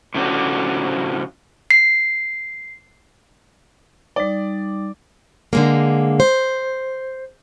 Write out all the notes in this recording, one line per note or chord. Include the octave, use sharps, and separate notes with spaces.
A2 C#3 F3 A3 D4 F#4
C7
G3 D#4 D5
D3 G#3 A#3
C5